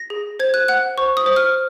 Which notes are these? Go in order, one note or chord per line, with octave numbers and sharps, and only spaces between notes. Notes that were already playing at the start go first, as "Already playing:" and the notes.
Already playing: A#6
G#4
C5 G#6
F#6
F#5 F#6
C5 C#6
D#6
C5
F6